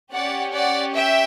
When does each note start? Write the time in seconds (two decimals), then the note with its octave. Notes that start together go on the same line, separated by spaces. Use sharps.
0.12 C#4 G4 D5 F#5
0.54 D5 F#5
0.95 E5 G5